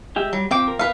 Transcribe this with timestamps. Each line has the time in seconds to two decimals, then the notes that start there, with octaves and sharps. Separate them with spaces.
0.16 G#3 G4 E5
0.33 F#3 G3
0.51 F3 C4 G5 D6
0.68 A#4
0.79 B3 A#4 B4 F5